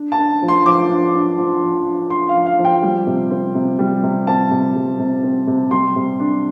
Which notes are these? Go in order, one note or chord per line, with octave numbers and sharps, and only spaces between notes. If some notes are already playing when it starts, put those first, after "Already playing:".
Already playing: D4
A5
D4
F3
C6
F3 D6
D4
D4
F3
F3
D4
D4 C6
F5
F3
F5
F3
G5
G3
C3
C4
C3
G3
C3
C4 A5
C3
G3
C3
C4
C3
G3 C6
C3
D4